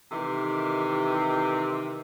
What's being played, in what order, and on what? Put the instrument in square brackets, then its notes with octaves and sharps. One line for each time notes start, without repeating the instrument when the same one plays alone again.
[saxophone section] C3 D#3 E3 A3 G4